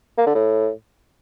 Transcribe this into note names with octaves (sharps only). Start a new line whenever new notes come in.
A#3
D3
A2